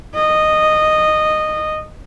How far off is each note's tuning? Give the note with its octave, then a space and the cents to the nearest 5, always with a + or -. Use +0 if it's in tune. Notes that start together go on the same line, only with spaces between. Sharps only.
D#5 -10